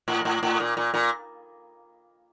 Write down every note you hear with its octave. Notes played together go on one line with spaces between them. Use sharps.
A2
A2
A2
A#2
A#2
A#2